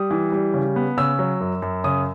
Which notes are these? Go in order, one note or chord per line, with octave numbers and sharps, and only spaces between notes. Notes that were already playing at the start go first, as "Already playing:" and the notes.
Already playing: G3 D#6
E3
G3
C#3
B3
C#3 E6
F#3
F#2
F#2
C#3 D#6